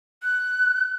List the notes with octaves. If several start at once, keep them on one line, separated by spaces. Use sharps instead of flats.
F#6